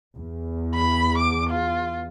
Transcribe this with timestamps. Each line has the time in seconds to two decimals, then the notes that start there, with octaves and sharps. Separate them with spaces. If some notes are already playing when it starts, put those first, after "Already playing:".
0.15 E2
0.75 B5
1.18 D6
1.50 F4